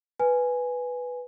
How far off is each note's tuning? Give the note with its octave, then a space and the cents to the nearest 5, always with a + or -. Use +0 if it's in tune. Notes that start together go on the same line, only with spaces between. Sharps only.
B4 +0 G#5 +0